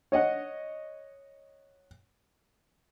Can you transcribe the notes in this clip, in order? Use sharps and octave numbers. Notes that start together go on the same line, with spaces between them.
C#5 D#5 F#5